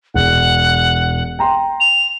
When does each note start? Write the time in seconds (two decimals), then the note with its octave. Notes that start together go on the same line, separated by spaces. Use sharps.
0.14 E1 F#5
1.39 G5 A#5 C6
1.80 F7